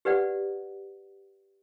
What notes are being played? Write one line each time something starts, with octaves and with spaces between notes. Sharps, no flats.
G4 B4 D5 F#5